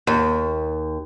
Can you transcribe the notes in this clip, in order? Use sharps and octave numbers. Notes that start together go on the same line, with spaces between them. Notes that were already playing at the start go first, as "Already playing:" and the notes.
D#2